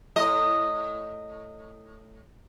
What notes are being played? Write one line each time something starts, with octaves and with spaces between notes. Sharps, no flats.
A2 D#5